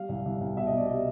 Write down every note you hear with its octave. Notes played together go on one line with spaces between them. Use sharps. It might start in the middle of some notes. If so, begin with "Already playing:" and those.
Already playing: G3 F5
C2
C2
C2
B2 E5
D#5
B2 D5
G3 D#5